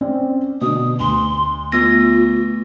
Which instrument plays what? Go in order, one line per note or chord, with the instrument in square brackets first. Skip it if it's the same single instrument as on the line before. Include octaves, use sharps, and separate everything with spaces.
[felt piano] C4 C#4 D5
[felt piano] B2 D3 [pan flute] D#6
[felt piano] D2 [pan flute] C6
[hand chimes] A3 B3 A#6 [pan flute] F4